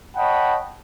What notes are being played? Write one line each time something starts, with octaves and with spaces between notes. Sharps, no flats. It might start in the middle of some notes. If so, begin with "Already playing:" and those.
C#5 D#5 F#5 G5 A5 B5